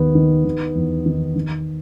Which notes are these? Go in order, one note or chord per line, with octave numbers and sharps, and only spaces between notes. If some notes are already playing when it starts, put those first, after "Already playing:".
Already playing: D#2 D#3 B3
D#3
D#3
E2
D#3
D#3